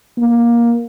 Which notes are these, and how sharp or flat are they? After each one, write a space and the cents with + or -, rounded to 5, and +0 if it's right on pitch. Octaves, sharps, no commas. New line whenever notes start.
A#3 +15